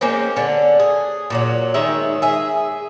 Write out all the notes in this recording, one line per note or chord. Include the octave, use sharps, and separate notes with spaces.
G#3 A#3 C4 C#4
D3 C#4
G#4
A#2 D3 F#3
D#3 G#3 C#5 E5
G#4 E5